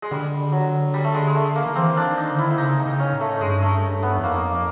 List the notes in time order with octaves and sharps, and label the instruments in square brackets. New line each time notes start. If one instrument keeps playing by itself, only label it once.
[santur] G#3
[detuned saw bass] D3 [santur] G3
[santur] F#3
G3
A3
G#3
G#3
A3
A#3
[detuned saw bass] D#3
[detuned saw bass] E3 [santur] C4
[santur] D4
[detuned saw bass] D#3
[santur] D#4
[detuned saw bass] D3
[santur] E4
E4
[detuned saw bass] C#3 [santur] D#4
[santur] D#4
[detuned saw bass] C#3
[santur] C#4
[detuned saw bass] A2
[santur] A3
[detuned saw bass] G2 [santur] G#3
[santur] A3
B3
[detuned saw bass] E2
[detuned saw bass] F2 [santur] A#3